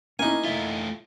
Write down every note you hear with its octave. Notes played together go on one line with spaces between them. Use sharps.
A#3 C#4 D#4 E4 G#5
A3 F4 E5